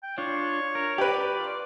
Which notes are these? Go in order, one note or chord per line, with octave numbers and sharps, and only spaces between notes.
G5
D4 F4 C#5
A#4
G4 B4 D5
F4